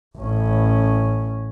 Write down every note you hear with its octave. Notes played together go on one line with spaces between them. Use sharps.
A1 C#4